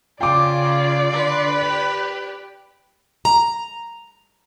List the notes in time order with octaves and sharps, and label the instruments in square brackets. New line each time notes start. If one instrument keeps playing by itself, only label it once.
[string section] C#3 [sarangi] F4 [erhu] D5 [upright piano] G5 D6
[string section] D3 C6 [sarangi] B4
[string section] G4
[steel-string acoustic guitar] A#5